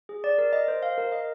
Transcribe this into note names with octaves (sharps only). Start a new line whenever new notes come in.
G#4
D5
A#4
D#5
C5
F5
A#4
D#5